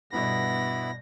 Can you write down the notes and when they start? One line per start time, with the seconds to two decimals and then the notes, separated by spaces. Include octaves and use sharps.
0.13 G1 G2 B2 B3 E4 B5 A#6